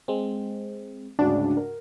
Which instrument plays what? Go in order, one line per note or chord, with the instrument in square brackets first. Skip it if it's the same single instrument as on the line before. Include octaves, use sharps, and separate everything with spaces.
[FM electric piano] G#3 C4
[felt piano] D2 G#2 C#3 [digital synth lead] D4 [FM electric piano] F#4
[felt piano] A#4